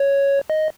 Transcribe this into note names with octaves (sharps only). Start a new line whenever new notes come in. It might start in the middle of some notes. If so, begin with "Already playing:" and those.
Already playing: C#5
D#5